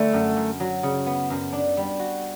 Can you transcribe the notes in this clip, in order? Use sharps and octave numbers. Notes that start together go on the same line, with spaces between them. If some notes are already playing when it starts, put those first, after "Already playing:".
Already playing: D3 G3 A3
F#2
F#2
F#3
C#3
B3
F#2
D4
G3
F#4